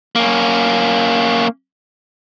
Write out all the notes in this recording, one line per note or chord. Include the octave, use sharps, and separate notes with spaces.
A#3 C#4